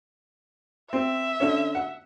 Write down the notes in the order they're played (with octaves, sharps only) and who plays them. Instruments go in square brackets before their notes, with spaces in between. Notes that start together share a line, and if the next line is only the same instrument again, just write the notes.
[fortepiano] C4 [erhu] E5
[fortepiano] D3 C#4
F#5